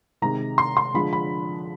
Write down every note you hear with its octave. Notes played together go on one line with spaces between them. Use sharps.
C3 D#3 G#3 A#5
C6
C6
D3 F3 G#3 B5
B5